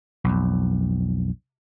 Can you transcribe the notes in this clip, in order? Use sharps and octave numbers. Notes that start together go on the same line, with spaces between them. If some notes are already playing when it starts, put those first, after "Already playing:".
B1 F2